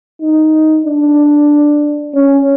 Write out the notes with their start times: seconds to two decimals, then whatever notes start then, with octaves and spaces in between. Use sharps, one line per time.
0.21 D#4
0.86 D4
2.14 C#4